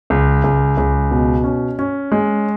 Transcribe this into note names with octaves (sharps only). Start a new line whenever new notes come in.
C#2
C#2
C#2
B2
C#4
C#4
G#3